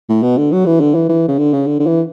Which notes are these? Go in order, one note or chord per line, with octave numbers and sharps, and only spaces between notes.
A2
B2
D3
F#3
E3
D3
E3
E3
C#3
D3
C#3
D3
D3
E3